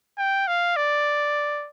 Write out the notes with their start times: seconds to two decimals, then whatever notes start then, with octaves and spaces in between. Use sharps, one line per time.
0.18 G5
0.47 F5
0.77 D5